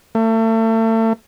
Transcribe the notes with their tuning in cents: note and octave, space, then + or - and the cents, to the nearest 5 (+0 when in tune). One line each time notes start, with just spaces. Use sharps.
A3 +35